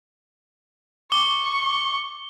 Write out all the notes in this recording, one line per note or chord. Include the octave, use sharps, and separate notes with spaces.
C#6 D6 G7